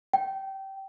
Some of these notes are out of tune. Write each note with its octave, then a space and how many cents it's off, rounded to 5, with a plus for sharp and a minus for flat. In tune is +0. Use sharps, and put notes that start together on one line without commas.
G5 -20